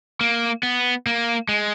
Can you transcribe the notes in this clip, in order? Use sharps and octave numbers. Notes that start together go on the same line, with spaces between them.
A#3
B3
A#3
G#3